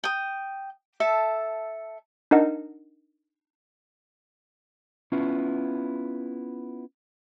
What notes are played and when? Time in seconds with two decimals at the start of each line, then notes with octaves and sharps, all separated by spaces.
0.04 G5 D#6
1.00 A4 E5 A5
2.31 D4 D#4 A#4 D#5 F#5
5.12 B3 C#4 E4 F4